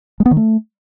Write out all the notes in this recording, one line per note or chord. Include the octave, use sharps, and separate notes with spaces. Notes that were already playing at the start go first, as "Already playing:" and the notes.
G#3
B3
D#3
A3